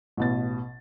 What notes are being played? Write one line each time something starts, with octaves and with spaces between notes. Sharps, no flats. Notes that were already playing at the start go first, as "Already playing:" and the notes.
A1 B2 A6